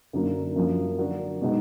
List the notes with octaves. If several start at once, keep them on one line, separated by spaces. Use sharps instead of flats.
F#2 D3 F#3 A#3
F#2 F3 A#3
D3 F#3 D4 F#4 A#4
B2 G#3 D#4 F#4